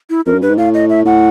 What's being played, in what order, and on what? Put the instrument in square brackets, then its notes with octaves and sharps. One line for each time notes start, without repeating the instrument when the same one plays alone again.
[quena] E4
[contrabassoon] F2 [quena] A#4
[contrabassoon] F#2
[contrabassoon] G2 [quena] B4
[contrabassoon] G#2
[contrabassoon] A2 [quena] F5
[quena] D#5
E5
[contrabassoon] A2 [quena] F#5